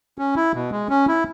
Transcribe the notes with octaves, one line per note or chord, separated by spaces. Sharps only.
C#4
E4
B2
G#3
C#4
E4